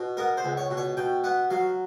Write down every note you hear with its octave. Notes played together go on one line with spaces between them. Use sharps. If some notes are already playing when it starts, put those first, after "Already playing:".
Already playing: B2
B3 A#4
C5
C#2
C#5
B2
C#5
B2 G5
B3 F#5
F#3 F5